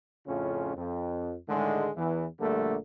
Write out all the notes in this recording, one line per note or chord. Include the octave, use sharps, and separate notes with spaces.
F2 A2 C#3 C#4 F4
F2
A2 D3 D#3 G#3
E2 E3
A#1 D3 G3 A3 A#3